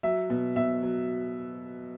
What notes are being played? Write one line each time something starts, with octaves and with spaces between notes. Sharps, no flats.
F#3 E5
B2
B2 E5
F#3